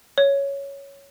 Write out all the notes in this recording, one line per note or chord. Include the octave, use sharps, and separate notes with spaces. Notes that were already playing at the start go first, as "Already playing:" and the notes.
C#5